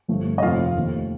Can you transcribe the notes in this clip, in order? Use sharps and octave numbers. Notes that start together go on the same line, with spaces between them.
G1 G2 F3 A3
D#5
F1 F2 C3 F3 F4 F5
D#2 D#3 A3